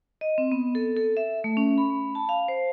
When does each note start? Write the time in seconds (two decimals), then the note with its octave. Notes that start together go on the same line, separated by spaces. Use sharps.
0.21 D#5
0.38 C4
0.52 B3
0.75 A4
0.97 A4
1.17 E5
1.44 A3
1.57 C#4
1.78 B5
2.15 A5
2.29 F5
2.48 C5